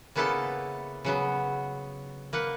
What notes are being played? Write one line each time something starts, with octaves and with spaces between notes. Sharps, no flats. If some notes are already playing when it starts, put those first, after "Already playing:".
C#3 A#3 B3 E4 A4 A5
C#3 F#3 B3
A#3 B4 F#5